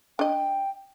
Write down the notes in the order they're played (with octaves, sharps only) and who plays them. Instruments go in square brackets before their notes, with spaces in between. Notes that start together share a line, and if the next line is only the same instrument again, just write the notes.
[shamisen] D4 D#5 [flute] G5